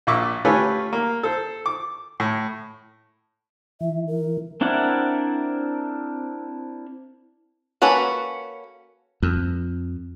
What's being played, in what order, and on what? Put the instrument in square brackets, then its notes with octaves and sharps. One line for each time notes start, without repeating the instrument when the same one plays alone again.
[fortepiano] A#1 A#2 E5 C#6 D6
A3 C#4 F4 G4 B4 G#5
A#3
A4 C5
D6
A2
[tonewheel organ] E3 [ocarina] E5
[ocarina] A#4
[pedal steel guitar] C4 D4 E4 A#4 F#5
[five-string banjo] A#3 C#4 F#4 A4 B4
[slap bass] F2